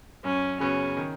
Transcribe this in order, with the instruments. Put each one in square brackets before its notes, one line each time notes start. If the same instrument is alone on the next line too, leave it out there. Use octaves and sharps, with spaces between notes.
[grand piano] F#2 [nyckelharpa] C#4
[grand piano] C#3 B3 F#4 [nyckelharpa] C#4
[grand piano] D#3